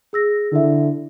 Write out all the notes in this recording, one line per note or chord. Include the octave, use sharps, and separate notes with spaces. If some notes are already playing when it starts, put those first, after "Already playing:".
G#4 E6 A#6
D3 E4 E5